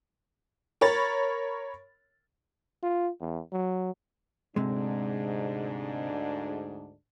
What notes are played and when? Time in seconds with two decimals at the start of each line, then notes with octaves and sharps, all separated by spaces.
0.81 A#4 C#5 B5 A6
2.83 F4
3.21 E2
3.52 F#3
4.56 D2 G#2 C3 G#3 D4